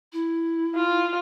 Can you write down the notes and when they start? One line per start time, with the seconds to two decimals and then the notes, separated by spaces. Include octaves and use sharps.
0.12 E4
0.75 F4